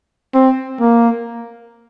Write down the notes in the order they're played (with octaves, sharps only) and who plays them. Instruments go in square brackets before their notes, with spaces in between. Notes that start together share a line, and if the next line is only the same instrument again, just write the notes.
[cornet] C4
A#3